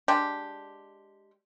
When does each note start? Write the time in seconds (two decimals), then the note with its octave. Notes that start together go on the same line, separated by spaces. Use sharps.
0.08 G#3 D4 G4